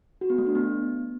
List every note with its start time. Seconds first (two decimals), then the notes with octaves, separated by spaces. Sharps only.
0.21 F#4
0.30 B3
0.38 A3
0.47 D4
0.55 B3